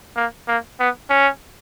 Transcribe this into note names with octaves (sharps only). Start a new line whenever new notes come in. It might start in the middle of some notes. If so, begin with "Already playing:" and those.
A#3
A#3
B3
C#4